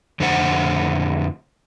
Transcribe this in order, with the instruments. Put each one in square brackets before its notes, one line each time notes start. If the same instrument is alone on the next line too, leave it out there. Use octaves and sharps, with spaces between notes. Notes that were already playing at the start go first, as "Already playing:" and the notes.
[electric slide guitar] F2 D3 A3 C5 F#5